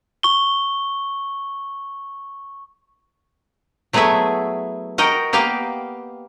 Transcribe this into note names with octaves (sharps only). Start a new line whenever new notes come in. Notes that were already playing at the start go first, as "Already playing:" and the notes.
C#6 G7
F#3 A3 B3 E4 G#4 E5
F#4 A#4 D#5 G5
A#3 B3 G4 F5 G5